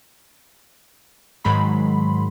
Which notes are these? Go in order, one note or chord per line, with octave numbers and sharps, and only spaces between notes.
G#2 D#3 F#3 G#3 B5 C6